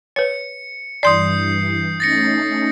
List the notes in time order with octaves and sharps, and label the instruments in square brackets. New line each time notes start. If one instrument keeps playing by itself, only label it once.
[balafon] B4 C#5 [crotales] C#7
[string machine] G2 E3 [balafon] D5 C6 [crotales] D#6 G6 C7
[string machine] A3 C#4 D#4 [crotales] A6 A#6 C#7